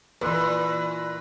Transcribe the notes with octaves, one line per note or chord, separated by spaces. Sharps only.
A#2 E3 B4 C6